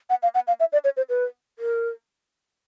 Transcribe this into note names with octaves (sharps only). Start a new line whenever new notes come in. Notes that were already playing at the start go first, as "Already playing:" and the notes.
F#5
F5
F#5
F5
E5
D5
C#5
C5
B4
A#4